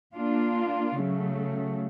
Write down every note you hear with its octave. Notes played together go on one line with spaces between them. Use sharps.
A#3 D4 F4
C#3 F#3 A3